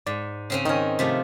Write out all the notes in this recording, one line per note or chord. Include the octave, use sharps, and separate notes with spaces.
G#2 D5
C#3 C4 C#4
D#3 C#4 D#4 A#4
C3 F3 A3